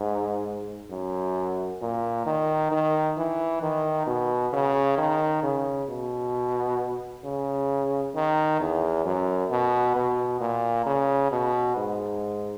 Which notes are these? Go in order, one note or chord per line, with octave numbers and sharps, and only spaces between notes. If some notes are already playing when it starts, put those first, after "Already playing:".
Already playing: G#2
F#2
A#2
D#3
D#3
E3
D#3
B2
C#3
D#3
C#3
B2
C#3
D#3
E2
F#2
B2
B2
A#2
C#3
B2
G#2